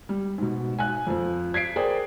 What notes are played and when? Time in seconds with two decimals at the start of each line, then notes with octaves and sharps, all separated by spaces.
0.09 G3
0.38 G#2 B2
0.79 G#5 F#6
1.07 F2 F3
1.54 G#6 B6 C7 D7
1.76 G#4 A#4 C5 D5 G5